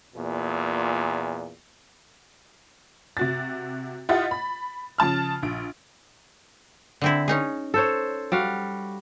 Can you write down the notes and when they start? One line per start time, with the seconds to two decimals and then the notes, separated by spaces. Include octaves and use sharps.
0.16 E2 A#2
3.17 C3 F#4 A6
4.09 E4 F4 G4 D#5 F#5 A6
4.31 B5
4.98 C#3 F3 A5 F6
5.43 A#1 D7
7.01 D3 C4 E4
7.28 C#4 D#4 G#4
7.74 A4 C5 C#5
8.32 G3 F#4 F5